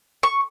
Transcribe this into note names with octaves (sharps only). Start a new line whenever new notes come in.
C#6